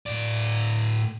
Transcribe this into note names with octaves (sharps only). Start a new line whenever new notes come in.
A2 D5